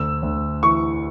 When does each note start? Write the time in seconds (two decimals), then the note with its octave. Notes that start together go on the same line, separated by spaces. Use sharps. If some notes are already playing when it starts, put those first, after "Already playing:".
Already playing: D2 E6
0.22 D2
0.63 E3 C#6